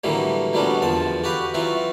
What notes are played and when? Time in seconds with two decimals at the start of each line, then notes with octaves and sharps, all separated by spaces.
0.04 A2 D3 E3 F#3 G3 A#3
0.53 A#2 F#3 G3 B3 C#4 D4
0.82 E2 D3 F3 A5
1.24 F#4 G4 B4 F5
1.54 E3 F#3 C4 F4 F#4